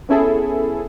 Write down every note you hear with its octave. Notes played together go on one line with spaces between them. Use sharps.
B3 C#4 E4 G#4 A4